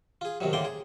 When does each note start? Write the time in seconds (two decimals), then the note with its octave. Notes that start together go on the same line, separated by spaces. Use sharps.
0.21 F4 G#4
0.40 A#1 F#2 C3 D#3 F#3
0.53 A2 D3 A#3 D5 G5 C6
0.65 G#4